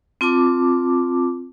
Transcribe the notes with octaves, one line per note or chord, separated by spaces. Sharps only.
C4 F4 A5 D6